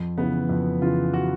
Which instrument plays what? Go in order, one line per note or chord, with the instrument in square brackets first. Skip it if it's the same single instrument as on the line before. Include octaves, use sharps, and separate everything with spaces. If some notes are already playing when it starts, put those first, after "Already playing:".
Already playing: [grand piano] F2
C#3 E3 B3 B4
F2
C#3 E3 F4
F#4